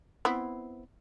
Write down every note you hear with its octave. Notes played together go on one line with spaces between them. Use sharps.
B3 C4 E4